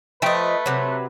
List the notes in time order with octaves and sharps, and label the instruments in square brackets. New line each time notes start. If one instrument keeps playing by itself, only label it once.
[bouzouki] F3 D#5 [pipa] A3 G5 [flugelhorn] B4
[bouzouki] C3 F#3